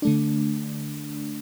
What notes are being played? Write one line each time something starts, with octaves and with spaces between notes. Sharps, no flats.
D3 A3 D4